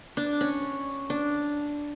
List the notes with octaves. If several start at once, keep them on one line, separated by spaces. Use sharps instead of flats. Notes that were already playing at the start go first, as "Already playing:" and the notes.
D4
C#4
D4